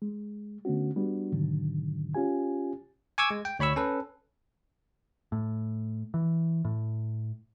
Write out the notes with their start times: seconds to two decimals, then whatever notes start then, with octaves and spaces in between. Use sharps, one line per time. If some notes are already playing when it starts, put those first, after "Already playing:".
0.02 G#3
0.65 D3 A3 B3 C#4 F#4
0.96 G3 B3 D4 F#4
1.32 G#2 B2 D3 D#3 F#3
2.15 C#4 F4 G4 G#5
3.18 G#5 C#6 D6 E6 G#6
3.30 G#3
3.45 G5
3.59 D2 C#5 B5 C#6 E6
3.76 C#4 A4 B4
5.32 A2
6.14 E3
6.65 A2